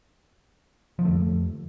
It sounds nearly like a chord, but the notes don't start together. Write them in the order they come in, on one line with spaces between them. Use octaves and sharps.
F3 D3 A3 F2